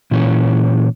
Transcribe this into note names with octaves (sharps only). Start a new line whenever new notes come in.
A#2 E3 C#4